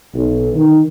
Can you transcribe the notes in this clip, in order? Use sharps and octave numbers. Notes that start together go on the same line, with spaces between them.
B1
D#3